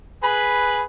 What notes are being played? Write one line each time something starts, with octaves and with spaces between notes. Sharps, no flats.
G#4 B4 B5